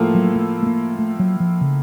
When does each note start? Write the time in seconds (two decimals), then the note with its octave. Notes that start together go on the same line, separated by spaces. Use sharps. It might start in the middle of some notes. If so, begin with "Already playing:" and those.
Already playing: A2 F3 A#3 F4 A4
0.15 F#3
0.36 A3
0.63 A3
0.66 A#3
0.99 A3
1.19 F#3
1.40 F3
1.61 C#3